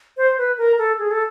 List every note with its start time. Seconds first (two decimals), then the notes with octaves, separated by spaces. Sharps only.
0.17 C5
0.38 B4
0.58 A#4
0.78 A4
0.99 G#4
1.11 A4